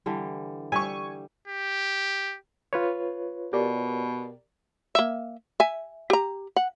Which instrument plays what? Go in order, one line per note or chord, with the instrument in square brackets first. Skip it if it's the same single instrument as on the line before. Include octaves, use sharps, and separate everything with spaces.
[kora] D3 E3 G3
[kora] G3 E5 [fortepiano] G#5 C#6
[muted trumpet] G4
[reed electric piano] F4 B4 C#5
[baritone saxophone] B2 [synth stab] G4 A#4 D5
[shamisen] A#3 E5
E5 G#5
G4 A#5
F#5